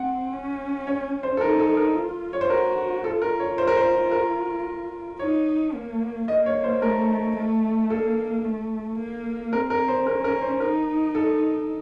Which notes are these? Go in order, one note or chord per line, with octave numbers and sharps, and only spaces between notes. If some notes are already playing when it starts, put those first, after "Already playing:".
Already playing: C4 F#5
C#4
C#5
C5
A4
D#4 A#4
A4
A#4
F4
C#5
C5
F#4 A#4
F4 A4
A#4
C#5
C5
A#4
C5
A#4
D#4 C#5
A#3
A#3 D#5
C#5
C5
A3 A#4
A3
A#3 A4
A3
A#3
C4 A#4
A#4
C5
C#4 A#4
A#4
C5
D#4 A#4
A4